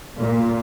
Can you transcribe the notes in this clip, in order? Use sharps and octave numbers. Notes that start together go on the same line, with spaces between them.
A#2